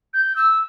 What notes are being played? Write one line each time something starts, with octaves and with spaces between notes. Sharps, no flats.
G6
E6